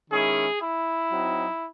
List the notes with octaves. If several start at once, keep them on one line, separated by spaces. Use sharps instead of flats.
D#3 G#3 C#4 E4 G#4
E4
F#3 C4 D#4